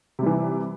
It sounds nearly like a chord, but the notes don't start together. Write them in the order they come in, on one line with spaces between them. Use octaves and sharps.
C3 G3 E3